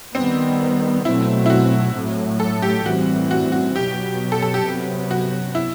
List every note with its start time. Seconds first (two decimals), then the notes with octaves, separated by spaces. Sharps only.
0.15 D#3 G3 B3 C4
1.05 B2 F#3 A3 C4 E4
1.46 E4
1.50 F#4
1.95 A2 F#3 A3
2.40 A4
2.62 G4
2.85 A2 E3 G3 C4 F#4
3.31 F#4
3.52 F#4
3.75 B2 F#3 B3 G4
4.32 A4
4.42 A4
4.54 G4
4.64 C3 F#3 B3
5.11 F#4
5.55 E4